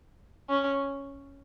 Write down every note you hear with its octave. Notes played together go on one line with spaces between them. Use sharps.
C#4